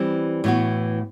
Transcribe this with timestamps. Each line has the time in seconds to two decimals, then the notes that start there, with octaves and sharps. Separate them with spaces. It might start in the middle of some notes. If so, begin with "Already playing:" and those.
Already playing: E3 G3 C4
0.44 A2 E3 B3 F#4